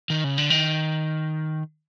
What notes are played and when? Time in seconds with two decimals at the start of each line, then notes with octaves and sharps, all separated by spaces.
0.10 D#3
0.24 C#3
0.38 D3
0.50 D#3